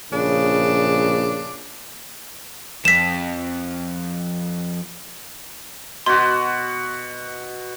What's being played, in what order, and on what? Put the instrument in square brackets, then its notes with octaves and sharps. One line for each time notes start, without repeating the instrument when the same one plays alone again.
[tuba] A#1 [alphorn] C#3 [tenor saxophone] D4
[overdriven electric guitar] F2 [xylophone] B6 E7
[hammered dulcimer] B2 F#4 [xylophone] C6